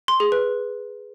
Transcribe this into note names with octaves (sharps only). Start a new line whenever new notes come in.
C6
G#4
B4